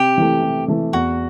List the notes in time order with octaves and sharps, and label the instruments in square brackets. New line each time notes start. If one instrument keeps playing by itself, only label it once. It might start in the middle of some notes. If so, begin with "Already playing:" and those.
Already playing: [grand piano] C3 [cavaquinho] G4
[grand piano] E3 A3
C3
E3 A3
[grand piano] E2 [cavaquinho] F#4